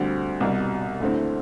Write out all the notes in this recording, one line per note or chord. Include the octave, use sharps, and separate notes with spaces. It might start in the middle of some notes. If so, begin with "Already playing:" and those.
Already playing: D2 D3 G3 C4 F#4
C2 B2 G3
D2 D3 A3 C4 E4